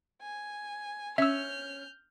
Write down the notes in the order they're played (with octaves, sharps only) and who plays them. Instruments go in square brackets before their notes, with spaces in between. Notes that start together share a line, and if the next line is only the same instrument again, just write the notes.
[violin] G#5
[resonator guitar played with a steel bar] C#4 [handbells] E5 E6 [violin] F6 G6